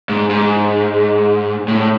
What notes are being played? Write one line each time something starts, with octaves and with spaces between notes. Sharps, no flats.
G#2
G#2
A2